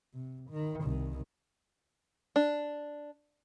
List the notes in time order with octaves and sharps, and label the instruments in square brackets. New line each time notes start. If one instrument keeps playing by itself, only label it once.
[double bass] C3
D#3
C2 D#3
[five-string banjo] D4